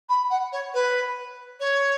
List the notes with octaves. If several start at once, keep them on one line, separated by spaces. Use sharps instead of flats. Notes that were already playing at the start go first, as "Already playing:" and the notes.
B5
F#5
C#5
B4
C#5